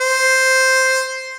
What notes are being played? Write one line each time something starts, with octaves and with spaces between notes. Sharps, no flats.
C5